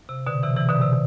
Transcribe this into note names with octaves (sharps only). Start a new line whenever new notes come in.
C3
B2 D3
C3 E3
C3 E3
B2 D3
C3